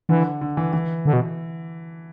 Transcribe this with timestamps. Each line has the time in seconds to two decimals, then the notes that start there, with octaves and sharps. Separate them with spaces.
0.09 D3 E3
0.41 D3
0.57 E3
0.73 E3
1.06 D3
1.13 B2